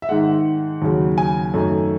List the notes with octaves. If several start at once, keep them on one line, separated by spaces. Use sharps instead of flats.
E5
G#2 D#3 G#3 F#5
D#2 C#3 F#3
G#5
F#2 D#3 A3